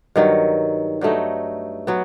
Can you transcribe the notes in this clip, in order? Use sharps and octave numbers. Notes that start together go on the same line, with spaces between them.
G2 D#3 F#3
G2 F#3 A3 D#4
F#3 B3